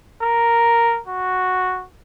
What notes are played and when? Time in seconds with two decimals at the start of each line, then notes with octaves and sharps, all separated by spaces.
0.23 A#4
1.07 F#4